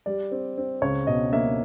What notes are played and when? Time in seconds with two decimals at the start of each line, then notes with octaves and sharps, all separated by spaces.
0.06 G3 D5
0.31 C4
0.58 C4
0.82 C#2 C#5
1.07 B2 D#5
1.33 A#3 E5